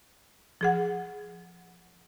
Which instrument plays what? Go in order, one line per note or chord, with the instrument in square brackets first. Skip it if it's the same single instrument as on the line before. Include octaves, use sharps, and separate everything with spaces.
[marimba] F3 G#4 F#5